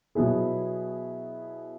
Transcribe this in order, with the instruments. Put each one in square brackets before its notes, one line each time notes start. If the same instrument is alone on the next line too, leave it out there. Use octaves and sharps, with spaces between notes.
[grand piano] B2 F#3 B3 E4 G#4